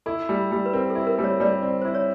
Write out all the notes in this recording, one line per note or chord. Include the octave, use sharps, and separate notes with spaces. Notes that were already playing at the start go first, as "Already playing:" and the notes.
E4 A4
G3
G3
B4
C4 A#4
A4
E4
A#4
G3
C#5
G3 D5
C4
E4 C5
C#5